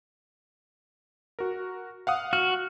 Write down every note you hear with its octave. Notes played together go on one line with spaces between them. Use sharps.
F#4 A#4
F5 F#5 D#6
F#4 F6